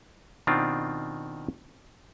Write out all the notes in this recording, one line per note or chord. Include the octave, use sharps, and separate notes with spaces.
B2 D#3 C4 D4 F4